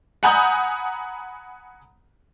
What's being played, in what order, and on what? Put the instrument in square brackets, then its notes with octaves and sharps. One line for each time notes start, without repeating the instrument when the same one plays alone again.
[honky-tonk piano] F#5 G#5 A#5 B5 D#6 G6